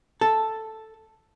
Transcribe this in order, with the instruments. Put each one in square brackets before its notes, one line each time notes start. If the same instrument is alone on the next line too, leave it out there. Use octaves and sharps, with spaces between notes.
[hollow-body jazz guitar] A4